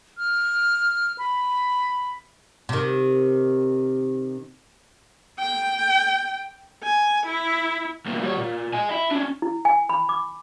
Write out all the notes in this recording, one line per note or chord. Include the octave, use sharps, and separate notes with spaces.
F6
B5
C3 D#3
G5
G#5
E4
C2 A#2
G3 C#5
A#2
D#5 G#5
E4
C#4 D4
E4
G#5
B5
D6